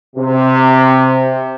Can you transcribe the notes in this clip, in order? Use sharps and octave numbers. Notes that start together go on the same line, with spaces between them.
C3